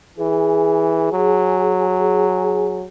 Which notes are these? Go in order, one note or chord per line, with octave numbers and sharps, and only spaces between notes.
E3 G#4
F#3